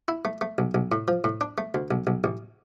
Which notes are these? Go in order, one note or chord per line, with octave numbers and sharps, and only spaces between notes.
E4
A3
A3
B1
B1
A2
F3
A2
D4
A3
D2
B1
B1
A1